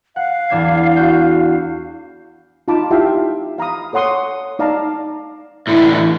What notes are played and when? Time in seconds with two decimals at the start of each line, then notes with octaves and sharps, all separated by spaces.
0.16 F5 F#5
0.50 E2 D4 G#6
0.96 F#4 G6
2.68 D#4 F4 F5 A5 B5 D6
2.90 E4 F4 G4 E5 F5 G5
3.58 F5 A#5 B5 D#6
3.93 A4 C#5 F#5 C6 D#6
4.59 D#4 D5 F5 A5 A#5
5.67 A2 D3 E3 E4
5.98 E3